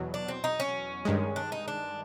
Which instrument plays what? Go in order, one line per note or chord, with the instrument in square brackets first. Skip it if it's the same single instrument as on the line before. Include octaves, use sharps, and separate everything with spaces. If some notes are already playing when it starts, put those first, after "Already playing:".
Already playing: [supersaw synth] E2 B2 F#3
[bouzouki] D4
C4
D#4
C#4
[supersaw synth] G2 D#3 G#3
[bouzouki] D4
D#4
D4